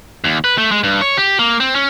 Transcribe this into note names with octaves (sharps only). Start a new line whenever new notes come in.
D#2
B4
A3
G#3
G2
C#5
G4
A#3
C4
C#4